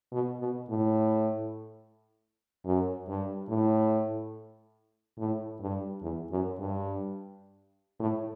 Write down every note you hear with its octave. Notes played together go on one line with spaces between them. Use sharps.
B2
B2
A2
F#2
G2
A2
A2
G2
E2
F#2
G2
A2